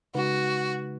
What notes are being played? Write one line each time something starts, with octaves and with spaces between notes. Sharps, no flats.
C#3 G#3 D#4 F#4 B4